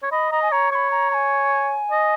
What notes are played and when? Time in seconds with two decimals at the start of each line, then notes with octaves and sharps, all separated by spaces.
0.03 C#5
0.11 D#5 B5
0.31 D#5 A#5
0.42 G#5
0.52 C#5 A#5
0.71 C#5 B5 C#6
0.91 A#5
1.11 A#5
1.14 G#5
1.91 D#5